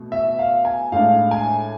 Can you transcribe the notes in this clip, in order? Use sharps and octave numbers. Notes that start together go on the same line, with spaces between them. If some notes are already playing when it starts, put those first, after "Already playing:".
Already playing: B2 A3
E5
F5
G#5
A2 G#3 D4 F5
G#5